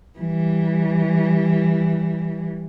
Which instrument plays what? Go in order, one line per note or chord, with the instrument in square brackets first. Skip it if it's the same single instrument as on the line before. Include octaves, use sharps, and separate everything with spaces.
[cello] E3 G3